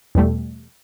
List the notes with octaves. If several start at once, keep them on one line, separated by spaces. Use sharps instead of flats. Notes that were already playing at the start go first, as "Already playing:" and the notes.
E2 B2 G3 A3